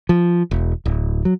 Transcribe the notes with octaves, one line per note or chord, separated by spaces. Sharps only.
F3
E1
D1
F#3